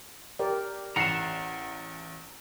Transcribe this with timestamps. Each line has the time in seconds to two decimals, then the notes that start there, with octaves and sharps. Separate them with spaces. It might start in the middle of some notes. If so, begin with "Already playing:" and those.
0.39 G4 A#4 D5
0.96 A1 F#5 A#5 C7 E7